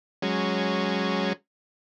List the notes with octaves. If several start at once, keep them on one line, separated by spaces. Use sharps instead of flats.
F#3 G#3 C#4